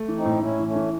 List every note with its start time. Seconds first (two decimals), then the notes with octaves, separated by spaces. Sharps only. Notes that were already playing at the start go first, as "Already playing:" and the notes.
Already playing: A3
0.08 E3
0.17 C4 D#4
0.25 A2
0.42 A2 C#4 E4
0.59 E3
0.67 A3 C#4
0.75 E3